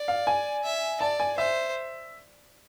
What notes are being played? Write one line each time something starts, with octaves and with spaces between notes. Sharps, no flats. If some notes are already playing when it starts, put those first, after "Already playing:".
Already playing: D5
F5
G#5
E5
D5 A5
G#5
C5 E5